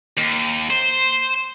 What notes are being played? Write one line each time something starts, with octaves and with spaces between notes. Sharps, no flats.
D#2
C5